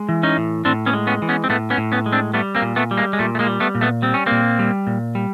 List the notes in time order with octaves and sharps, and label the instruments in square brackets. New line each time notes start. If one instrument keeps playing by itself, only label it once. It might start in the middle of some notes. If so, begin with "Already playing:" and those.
Already playing: [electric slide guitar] G#3
E3
C#4 D#4
A2
A2 C4 D4
B3 C#4
G#3
B3 C#4
E3
B3 C#4
C4
A2 A3 B3
B3 C#4
A2
B3 C#4
G#3
C4 D4
G3 A3 B3
A#3 C4
A#2
A3 B3
G3
G#3 A#3
G#3
A#2 A3
A3
G#3 A#3
G3
A3 B3
A#2
A3 B3
G3 C4
C#4
A#2 A#3 C4
G3
A#2
G3